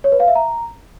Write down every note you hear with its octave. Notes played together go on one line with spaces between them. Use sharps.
C#5
B4
F5
E5
A#5